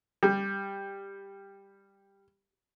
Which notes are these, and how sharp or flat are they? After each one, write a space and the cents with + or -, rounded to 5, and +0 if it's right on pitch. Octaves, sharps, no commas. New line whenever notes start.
G3 +10